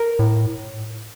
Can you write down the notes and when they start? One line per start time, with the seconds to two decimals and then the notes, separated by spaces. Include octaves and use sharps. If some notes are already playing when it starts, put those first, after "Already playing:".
Already playing: A#4
0.19 A2